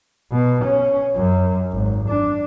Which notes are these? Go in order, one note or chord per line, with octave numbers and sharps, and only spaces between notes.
B2
C#4
F#2
G#1
D4